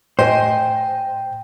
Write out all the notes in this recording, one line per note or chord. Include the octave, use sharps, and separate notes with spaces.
A2 C5 D#5 G5 G#5